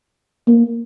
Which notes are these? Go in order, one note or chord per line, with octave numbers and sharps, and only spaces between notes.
A#3